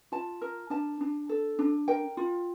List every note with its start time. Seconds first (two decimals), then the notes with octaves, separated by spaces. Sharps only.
0.12 F4 A5
0.41 A#4
0.70 D4 A5
1.01 D4
1.29 A4
1.59 D4
1.88 A#4 G5
2.17 F4